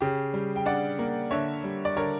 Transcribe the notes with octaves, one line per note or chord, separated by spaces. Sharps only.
C#3 G4
G3
G5
D4 D5 F#5
A#3
D3 C#5 E5
G3
D5
D3 A#4 C#5